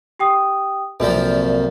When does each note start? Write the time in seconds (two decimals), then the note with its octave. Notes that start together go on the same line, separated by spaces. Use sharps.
0.19 G4 G5 D#6
1.00 C2 F#2 A#2 F3 A4